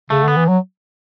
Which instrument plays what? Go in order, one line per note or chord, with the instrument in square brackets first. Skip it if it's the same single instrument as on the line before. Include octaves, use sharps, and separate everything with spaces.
[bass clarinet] C#3 [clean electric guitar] A3
[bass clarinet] D3 [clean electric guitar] B3
[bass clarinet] E3
F#3